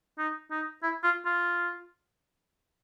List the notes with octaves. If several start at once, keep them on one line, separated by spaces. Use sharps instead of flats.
D#4
D#4
E4
F4
F4